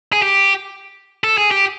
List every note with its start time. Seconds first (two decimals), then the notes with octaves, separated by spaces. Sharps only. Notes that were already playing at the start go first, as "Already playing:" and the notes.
0.13 G#4
0.22 G4
1.24 A4
1.38 G#4
1.51 G4